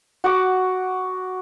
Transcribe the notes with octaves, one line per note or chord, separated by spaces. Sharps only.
F#4 F#5 D6